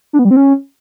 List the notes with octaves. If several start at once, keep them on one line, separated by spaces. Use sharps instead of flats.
D4
B3
G3
C4
C#4